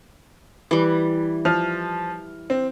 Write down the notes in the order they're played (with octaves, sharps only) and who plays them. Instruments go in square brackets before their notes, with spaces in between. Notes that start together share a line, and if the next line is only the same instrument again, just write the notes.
[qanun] E3 G3
[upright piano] F3 F6
C4